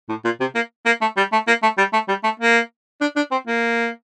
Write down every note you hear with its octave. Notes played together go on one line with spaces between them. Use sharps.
A2
A#2
C3
A#3
A#3
A3
G3
A3
A#3
A3
G3
A3
G3
A3
A#3
D4
D4
C4
A#3